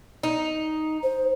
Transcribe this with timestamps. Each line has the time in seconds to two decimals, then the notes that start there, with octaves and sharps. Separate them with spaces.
0.23 D#4
1.03 C5